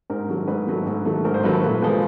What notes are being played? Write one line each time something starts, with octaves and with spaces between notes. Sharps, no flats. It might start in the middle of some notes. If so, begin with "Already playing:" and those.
G#2 A#4
D#3 F#3 A3
G#2 B4
D#3 F#3 A3
G#2
D#3 F#3 A3
G#2 A#4
C5
D#3 F#3 A3 B4
B4
A#2
F3 G#3 B3